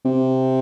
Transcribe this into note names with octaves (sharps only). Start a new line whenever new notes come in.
C3